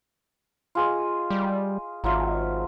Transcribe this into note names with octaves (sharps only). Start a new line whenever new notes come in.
F4 G#4 D#5
G3
G#1 F#3 F4 E5